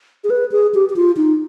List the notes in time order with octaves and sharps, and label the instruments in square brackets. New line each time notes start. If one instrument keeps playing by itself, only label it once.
[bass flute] G#4
B4
G#4
G4
G4
F4
D#4